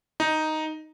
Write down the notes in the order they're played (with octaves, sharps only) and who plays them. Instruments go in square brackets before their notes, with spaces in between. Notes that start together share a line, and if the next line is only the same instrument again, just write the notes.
[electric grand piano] D#4